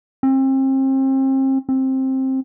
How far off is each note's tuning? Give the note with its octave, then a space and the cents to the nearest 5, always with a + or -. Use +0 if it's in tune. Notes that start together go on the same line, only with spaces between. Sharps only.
C4 +35
C4 +15